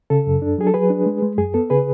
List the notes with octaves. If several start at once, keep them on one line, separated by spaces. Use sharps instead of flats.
C#3 A4
F#2
D4
F#3 G#4
A4
F#3 G#4 B4
D4
G#3
G#3
F#2 G#4
B3 A4
C#3 G#4 B4